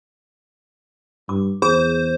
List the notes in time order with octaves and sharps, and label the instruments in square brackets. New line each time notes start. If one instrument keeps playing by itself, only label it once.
[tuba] G2 [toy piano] D6
[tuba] E2 [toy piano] G#4 [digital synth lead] C5